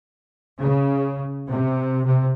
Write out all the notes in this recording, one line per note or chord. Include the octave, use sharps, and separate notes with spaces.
C#3
C3
C3